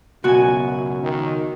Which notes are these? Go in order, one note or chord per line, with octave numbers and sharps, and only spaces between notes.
C#2 F#2 B2 F#4 G#5
D#3